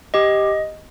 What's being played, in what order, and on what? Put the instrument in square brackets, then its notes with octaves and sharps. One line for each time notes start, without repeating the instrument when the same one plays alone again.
[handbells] G4 D#5